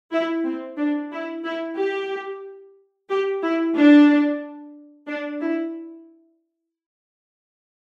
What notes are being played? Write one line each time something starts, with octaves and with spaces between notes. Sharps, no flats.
E4
C4
D4
E4
E4
G4
G4
E4
D4
D4
E4